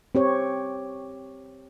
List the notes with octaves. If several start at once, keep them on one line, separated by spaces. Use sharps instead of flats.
C4 G4 C#5